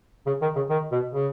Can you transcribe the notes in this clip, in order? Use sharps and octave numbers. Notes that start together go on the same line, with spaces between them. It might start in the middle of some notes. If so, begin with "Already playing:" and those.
C#3
D#3
C#3
D#3
B2
C#3